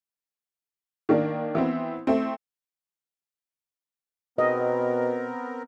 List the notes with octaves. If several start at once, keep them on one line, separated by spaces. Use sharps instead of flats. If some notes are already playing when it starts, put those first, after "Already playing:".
D#3 A#3 D4
E3 B3 C4
A3 C4
B2 B3 C4 A#4 D#5